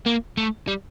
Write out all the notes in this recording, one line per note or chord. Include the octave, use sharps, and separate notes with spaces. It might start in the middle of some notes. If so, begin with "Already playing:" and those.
A#3
A3
G3